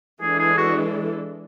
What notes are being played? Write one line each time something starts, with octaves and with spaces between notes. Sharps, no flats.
E3 G#3 D4 G#4 A4
G#4
F#4